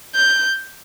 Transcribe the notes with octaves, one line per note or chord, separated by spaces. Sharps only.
G6